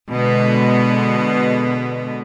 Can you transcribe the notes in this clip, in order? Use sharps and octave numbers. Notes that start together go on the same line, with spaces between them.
B2 D3 G#3 B3